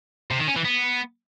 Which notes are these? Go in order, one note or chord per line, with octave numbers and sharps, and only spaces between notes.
C3
D#3
C#4
E3
B3